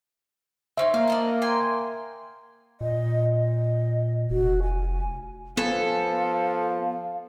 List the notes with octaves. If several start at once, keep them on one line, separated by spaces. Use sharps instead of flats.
C4 C#4 D#4 E5
A#3 F5
D4 D#5 A5
G5 G#5 C6
A#2 D#5
D#5
F1 F#4
G#5
F3 B3 A4 B4 F5 G#5